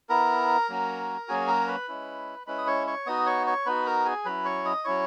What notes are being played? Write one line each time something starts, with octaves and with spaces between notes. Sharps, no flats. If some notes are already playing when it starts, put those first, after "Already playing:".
B3 E4 A#4 A#5
F#3 A#3 C#4 F#4
F#3 A#3 C#4 F#4 G#4 G#5
A#4 A#5
B4 B5
G#3 C#4 E4
G#3 C#4 E4 B4 B5
D#6
C#5 C#6
C#5 C#6
B3 D#4 F#4 D#5 D#6
C#5 C#6
C#5 C#6
B3 D#4 F#4 B4 B5
A#4 A#5
G#4 G#5
F#3 C#4 E4 B4 B5
C#5 C#6
D#5 D#6
F#3 C#4 E4 C#5 C#6